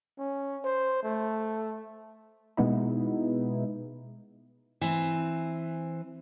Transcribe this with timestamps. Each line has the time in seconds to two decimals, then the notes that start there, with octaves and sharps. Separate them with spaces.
0.18 C#4
0.64 C5
1.03 A3
2.57 B2 G#3 B3 D#4 E4
4.81 E3 C4